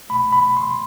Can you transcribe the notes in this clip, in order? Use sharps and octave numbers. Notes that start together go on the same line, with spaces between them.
C2 B2 A3 B5
B5
C6